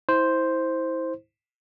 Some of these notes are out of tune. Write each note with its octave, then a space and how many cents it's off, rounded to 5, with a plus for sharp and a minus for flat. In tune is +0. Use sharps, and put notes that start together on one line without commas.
E4 -25 C5 +0